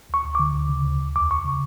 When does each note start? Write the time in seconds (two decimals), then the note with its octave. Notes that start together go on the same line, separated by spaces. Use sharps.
0.10 D2 C#6
0.25 D2
0.35 D3 D6
0.54 D2
0.69 C#3
0.85 D2
1.00 D2
1.16 E2 D6
1.30 E2 C#6
1.45 C#3